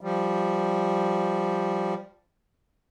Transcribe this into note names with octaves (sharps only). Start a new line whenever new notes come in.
F3 G3